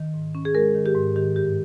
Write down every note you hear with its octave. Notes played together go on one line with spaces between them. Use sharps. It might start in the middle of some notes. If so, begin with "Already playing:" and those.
Already playing: D#3
G#2
C#4
G#4
G#3 A#4
D#3
G4
G#2
D#3 G4
G2 G4